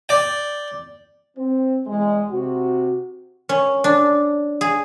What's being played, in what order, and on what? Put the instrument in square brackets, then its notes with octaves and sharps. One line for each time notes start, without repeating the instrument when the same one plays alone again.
[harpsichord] D5 G5
[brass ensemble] C4
E2 G#3
C3 C4 F#4
[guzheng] C#4
D4
G#4